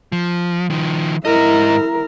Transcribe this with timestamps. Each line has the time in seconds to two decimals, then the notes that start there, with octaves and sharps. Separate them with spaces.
0.12 F3
0.70 D#3 F3
1.25 G#2 E4 A#4 D#5